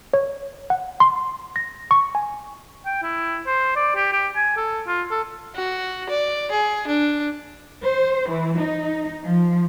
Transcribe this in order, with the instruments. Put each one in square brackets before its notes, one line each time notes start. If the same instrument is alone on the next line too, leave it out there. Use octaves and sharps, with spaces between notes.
[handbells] C#5
F#5
C6
A#6
C#6
G#5
[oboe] G5
E4
C5
D5
G4
G4
G#5
A4
F4
A4
[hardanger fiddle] F#4
D5
G#4
D4
[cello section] C5
E3
D#4
F3